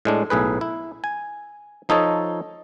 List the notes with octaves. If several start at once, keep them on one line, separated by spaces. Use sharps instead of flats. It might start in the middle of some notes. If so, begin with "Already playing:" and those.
A2 G#3 D4
B1 A2 G#4 B4
E4
G#5
F3 D#4 A4 C#5 D#5